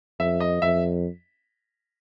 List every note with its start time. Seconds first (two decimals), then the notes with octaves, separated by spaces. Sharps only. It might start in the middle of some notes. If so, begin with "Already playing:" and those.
0.20 F2 E5
0.40 D#5
0.62 F2 E5